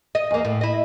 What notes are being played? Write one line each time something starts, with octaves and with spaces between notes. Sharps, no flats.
D#5
E2 A#3
A2
E4 D#5